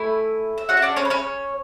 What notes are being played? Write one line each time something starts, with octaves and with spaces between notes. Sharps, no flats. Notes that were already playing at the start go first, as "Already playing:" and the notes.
Already playing: A3 E4 G#5
E5
C#4 F#4 G#4 F#5
E5
D4 D5
C#4 C#5
B4
C#4 C#5